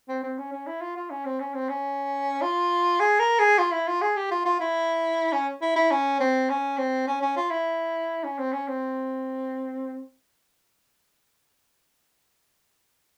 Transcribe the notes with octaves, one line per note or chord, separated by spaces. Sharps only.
C4
C4
C#4
C#4
E4
F4
F4
C#4
C4
C#4
C4
C#4
F4
G#4
A#4
G#4
F4
E4
F4
G#4
G4
F4
F4
E4
C#4
E4
E4
C#4
C4
C#4
C4
C#4
C#4
F4
E4
C#4
C4
C#4
C4